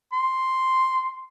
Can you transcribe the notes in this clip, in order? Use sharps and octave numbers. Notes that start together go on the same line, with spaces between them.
C6